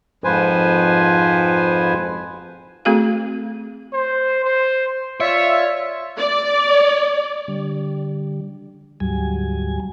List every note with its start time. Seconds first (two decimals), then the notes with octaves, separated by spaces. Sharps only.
0.24 F2 G#2 F3 B4 C5 G#5
2.85 A3 C4 F#4 G#4 A4 F5
3.93 C5
4.44 C5
5.20 F4 C#5 D5 E5
6.18 D5
7.48 D3 G3
9.00 D2 G#2 F#3 G3 G#5